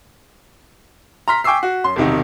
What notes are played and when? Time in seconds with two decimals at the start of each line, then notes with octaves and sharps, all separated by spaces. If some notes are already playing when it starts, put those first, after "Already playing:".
1.28 A#5 C6 F6 B6
1.44 G5 G#5 C#6 D6 E6 C7
1.63 F#4
1.84 F#2 C6
1.96 E1 C2 C3 D#3 D#4